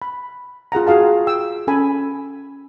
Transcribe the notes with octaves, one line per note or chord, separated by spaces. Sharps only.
B5
F4 G#4 F#5 A#5
F4 F#4 G#4 F5 A5
G5 E6
C#4 A4 G#5 B5